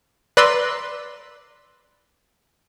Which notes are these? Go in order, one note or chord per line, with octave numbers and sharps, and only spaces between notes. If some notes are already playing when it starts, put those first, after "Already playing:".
B4 D5 A#5 C6 E6